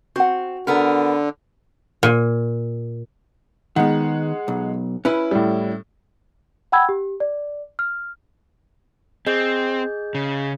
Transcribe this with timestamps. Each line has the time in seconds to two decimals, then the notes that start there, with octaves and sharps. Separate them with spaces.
0.16 C4 F#4 F#5
0.67 D3 B3 A#4
2.03 A#2
3.76 D#3 G#3 B3 F#5
4.48 B1
5.05 C#4 E4 B4
5.31 A2 G3
6.72 F#5 G5 B5 E6 G#6
6.89 G4
7.20 D5
7.79 F6
9.27 C4 G#4 D#5 G6
10.15 C#3